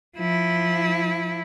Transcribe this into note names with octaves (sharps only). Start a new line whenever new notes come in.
F3 E4